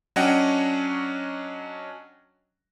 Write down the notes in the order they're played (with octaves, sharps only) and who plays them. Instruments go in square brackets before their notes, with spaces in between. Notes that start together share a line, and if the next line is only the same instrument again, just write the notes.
[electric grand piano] F#3 C#4 D4 D#5 F#5 G5